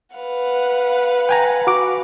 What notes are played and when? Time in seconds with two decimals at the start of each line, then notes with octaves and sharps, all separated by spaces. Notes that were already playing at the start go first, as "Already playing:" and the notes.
0.16 B4 F5 F#5
1.29 G5 G#5 A#5
1.67 F#4 D6